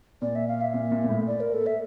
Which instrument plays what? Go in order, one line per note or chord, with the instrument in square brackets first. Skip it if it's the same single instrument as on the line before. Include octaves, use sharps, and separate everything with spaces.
[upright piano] A#2 [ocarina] D5
[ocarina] E5
F5
E5
[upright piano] A#2
A#2
A#2
A2
[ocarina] D5
A#4
A4
E5